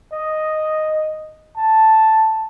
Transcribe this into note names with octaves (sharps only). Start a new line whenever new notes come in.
D#5
A5